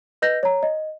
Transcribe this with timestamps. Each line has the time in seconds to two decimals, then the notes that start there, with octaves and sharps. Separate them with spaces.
0.22 B4 D#5 G6 A#6
0.43 C#5 A#5
0.63 D#5